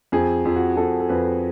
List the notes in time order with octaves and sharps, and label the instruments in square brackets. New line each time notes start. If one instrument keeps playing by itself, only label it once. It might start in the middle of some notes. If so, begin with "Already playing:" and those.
[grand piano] F2 G#4
F2
F#4
F2 A4
A4
F2 B4